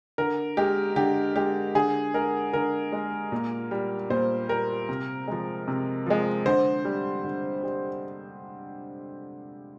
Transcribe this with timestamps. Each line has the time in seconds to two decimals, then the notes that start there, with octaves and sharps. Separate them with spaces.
0.18 D3 A#4
0.57 G#3 G4
0.96 D3 G4
1.36 G#3 G4
1.75 D3 G#4
2.14 G#3 A#4
2.53 D3 A#4
2.93 G#3
3.32 A#2
3.71 G3
4.10 A#2 C5
4.49 G3 A#4
4.89 C3
5.28 F3 G#3
5.68 C3
6.06 F3 G#3
6.46 D3 C5
6.85 G3
7.24 D3
7.63 G3